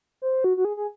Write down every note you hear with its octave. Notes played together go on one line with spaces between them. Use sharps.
C5
F#4
F#4
G#4
G#4